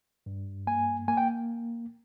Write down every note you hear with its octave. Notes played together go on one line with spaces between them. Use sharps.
G2
A#3 G#5
A#3 G#5
G5